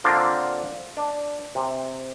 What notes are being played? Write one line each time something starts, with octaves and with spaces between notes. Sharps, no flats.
D3 A#3 C4 D4 F4 A#4
D4
C3